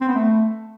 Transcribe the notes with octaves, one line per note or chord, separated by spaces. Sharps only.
C4
B3
A3